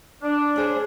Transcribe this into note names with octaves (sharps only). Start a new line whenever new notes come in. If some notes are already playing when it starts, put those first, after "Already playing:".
D4
C#4 G#4 C5